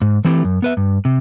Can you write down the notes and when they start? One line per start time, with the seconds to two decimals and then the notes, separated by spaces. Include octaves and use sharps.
0.02 G#2
0.25 E3 A3 C4 E4 G4
0.45 F#2
0.62 B3 B4 E5
0.77 G2
1.05 C3